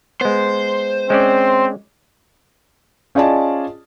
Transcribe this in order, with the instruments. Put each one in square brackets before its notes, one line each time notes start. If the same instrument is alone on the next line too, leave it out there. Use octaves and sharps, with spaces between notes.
[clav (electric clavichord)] G#3 B3 [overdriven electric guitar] C5
[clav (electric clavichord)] G#3 C#4 D5 [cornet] C4
[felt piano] C#4 F4 G#4 D5 D#5 A5